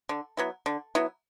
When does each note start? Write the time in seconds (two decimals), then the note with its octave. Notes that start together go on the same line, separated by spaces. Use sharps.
0.09 D3
0.37 F#3 B3 E4
0.66 D3
0.95 F#3 B3 E4